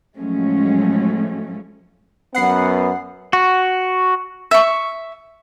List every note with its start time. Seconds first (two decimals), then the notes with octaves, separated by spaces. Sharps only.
0.17 A2 F3 F#3 G#3 A3 C#4
2.35 F#2 B3 F#5 C7
3.33 F#4
4.51 E5 C#6